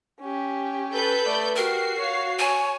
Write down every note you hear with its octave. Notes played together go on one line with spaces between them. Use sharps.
C#4 G4
A4 B4 G6
A3 D5
F#4 G4 A#4 C7
C#5 F5
C#5 G#5